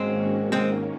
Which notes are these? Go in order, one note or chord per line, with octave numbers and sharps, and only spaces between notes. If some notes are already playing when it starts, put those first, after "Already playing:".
Already playing: G#2 D#3 G#3 A#3 C4 C#4 F#4
G#2 D#3 G#3 A#3 C4 C#4